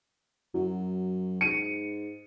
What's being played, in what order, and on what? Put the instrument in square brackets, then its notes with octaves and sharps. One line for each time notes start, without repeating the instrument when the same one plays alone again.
[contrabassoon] F#2 [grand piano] F#3
[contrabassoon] G#2 [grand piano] C#7 D#7